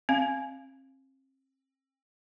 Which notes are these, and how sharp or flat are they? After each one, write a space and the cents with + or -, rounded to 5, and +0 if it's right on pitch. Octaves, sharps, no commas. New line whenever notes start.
C4 +40 F5 -10